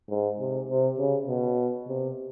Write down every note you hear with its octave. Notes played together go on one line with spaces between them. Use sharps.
G#2
C3
C3
C#3
B2
C3